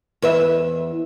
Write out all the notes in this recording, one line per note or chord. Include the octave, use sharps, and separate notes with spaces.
E2 B4 E5